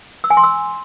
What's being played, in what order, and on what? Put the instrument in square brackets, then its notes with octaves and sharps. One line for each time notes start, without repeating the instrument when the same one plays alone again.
[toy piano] E6
G#5
C6
E6